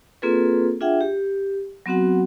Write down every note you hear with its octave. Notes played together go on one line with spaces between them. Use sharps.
A#3 C4 F4 G#4 A4 B4
D4 F4 G#4 E5 F#5 G5
G4
F#3 B3 C4 F#4 F#5